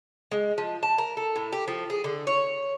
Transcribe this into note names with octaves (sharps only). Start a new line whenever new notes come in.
G#3
F3
A5
A#4
A4
A2
G4
F3
G#4
D3
C#5